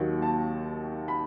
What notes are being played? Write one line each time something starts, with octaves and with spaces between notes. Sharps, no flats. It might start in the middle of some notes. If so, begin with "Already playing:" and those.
Already playing: D#2 D#3 F#3
A5
B5